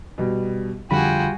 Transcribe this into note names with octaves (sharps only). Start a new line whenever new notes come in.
B2 G3
F2 D3 G3 F4 F#4 G#4 G5 B5